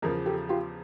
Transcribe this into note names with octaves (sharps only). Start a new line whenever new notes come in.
E2 C#3 F3 G#4 A#4
G4 A4
F4 G4